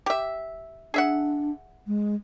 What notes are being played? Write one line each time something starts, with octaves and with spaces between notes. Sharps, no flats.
G4 E5
D4 G#4 E5 F#5
G#3